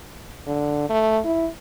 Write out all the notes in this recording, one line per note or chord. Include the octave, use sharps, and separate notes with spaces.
D3
A3
E4